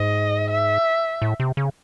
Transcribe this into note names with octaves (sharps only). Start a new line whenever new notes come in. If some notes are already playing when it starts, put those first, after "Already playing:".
Already playing: G#2 D#5
E5
A2
C3
C#3